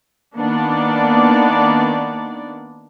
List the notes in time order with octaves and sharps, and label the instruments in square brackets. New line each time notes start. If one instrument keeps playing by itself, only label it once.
[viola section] D#3 A#3 B3 D4 D5